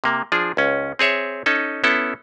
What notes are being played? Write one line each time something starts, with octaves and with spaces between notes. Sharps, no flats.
C3 A#3
F3 D4 G#4
C#2 C#4
C4 G#4 C#5 E5
C#4 D#4 A4
B3 C#4 E4 A4